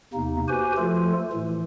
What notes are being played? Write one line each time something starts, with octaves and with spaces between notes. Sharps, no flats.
E2 C3 A#3 D#4
F#4 G4 B4 C5 G#5
F3 A3 F4 A4
A2 E3